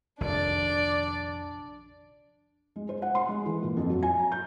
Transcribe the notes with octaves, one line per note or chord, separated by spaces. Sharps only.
F1 A#1 D#3 D4 D5
G#3
C5
F#5
C6
G#3
E3
A#2
F2
F#3
G#5
A#5
G6